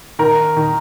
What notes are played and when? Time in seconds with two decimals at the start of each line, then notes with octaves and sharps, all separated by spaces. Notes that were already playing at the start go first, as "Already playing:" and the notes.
0.19 D#3 A#4
0.57 D#3